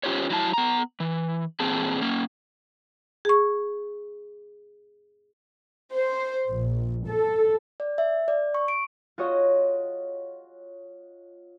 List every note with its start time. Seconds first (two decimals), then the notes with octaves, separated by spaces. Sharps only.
0.03 C#4 F4 G4 C5 C#5
0.30 F#3 E4 A5
0.53 B3 A#5
1.00 E3
1.60 E2 A#2 C4 G#4 A5
2.01 A#3 C#4
3.25 G#4 C#6
5.95 C5
6.49 A#1
7.07 A4
7.80 D5
7.98 E5
8.28 D5
8.55 C#6
8.68 D7
9.18 F4 F#4 G#4 C#5 D#5